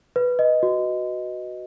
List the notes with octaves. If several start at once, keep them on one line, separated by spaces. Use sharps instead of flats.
B4
D#5
F#4